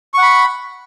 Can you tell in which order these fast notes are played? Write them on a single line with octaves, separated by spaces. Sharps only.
C#6 F#5 B5